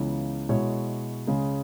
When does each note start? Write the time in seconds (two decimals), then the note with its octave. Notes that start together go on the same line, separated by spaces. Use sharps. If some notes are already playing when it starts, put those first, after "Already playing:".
Already playing: C#2 C#3 E3 B3
0.49 B2 G#3 E4 C#5
1.27 C#2 C#3 G#3